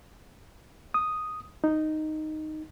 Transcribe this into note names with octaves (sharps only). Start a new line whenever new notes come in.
D#6
D#4